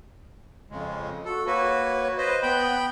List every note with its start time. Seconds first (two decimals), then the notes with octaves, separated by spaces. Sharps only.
0.70 F2 C#3 G#3
1.25 F#4 A4
1.47 A#3 F#4 B4 C#5
2.18 B4 C5 D#5
2.43 B3 G5 B5 G6